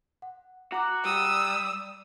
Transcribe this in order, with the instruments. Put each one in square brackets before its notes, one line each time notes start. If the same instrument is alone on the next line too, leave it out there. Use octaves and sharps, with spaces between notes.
[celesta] F#5
[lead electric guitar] F#4 [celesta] A#5 D6 F#6
[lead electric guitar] G3 [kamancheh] D#6 E6